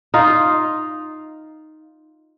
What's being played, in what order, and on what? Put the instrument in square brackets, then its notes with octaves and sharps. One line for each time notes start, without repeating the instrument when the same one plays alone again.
[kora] D#4 F4